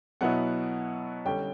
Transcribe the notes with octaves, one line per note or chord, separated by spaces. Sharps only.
B2 F#3 B3 E4 F#5
D3 G3 C#4 G5